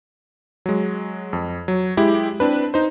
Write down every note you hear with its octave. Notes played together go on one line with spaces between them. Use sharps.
F#3 G#3
F2
F#3
G#3 E4 G4
C4 D4 B4
D#4 C5